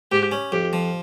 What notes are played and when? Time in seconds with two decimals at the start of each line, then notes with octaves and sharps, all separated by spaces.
0.11 G#2 G4
0.32 C#4
0.52 F2 G4
0.73 F3